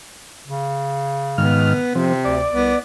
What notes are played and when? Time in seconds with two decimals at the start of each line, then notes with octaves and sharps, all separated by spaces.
0.47 C#3
1.38 G#2 D#3 B3 F6
1.95 C3 F3 C4
2.25 D2 D5
2.51 C2 B3